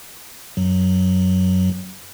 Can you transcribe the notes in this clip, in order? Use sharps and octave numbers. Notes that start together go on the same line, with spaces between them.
F#2 F#3